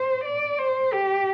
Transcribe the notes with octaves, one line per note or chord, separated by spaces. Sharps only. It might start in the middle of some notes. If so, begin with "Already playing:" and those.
Already playing: C5
D5
C5
G4